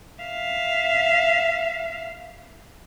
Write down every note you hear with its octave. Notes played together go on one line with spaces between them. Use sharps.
E5 F5